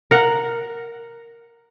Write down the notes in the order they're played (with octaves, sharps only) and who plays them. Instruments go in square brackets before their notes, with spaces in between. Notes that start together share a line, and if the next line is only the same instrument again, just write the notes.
[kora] A#4 F#5